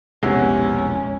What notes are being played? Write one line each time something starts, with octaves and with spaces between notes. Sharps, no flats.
E1 A#1 C3 G#3 B3 C#4 E4